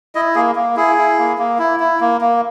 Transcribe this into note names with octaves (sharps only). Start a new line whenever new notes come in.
E4 D#5
A#3 G#4
A#3
E4 G#4
E4
A#3
A#3
E4
E4
A#3
A#3